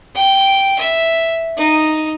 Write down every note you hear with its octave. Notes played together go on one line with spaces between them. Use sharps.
G5
E5
D#4